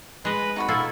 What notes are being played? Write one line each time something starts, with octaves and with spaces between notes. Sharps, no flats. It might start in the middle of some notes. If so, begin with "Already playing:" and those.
G#3 B4 D#5
D#4 F#4 B5
B2 E4 F4 A4